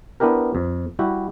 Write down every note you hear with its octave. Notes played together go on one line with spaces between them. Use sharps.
B3 D4 E4 G4 A#4
F2
G3 E4 F#4 G4